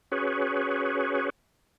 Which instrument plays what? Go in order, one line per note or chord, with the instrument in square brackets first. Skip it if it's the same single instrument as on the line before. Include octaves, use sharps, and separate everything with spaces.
[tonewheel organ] C#4 F#4 G#4 B4 C#5